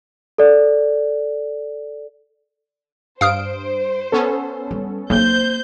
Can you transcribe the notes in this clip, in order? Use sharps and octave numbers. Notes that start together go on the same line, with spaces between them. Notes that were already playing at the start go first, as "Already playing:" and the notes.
A4 D5
G2 C5 F5 D#6 F6 D7
B3 C#4 A4
G3
B1 A#3 C4 C5 G6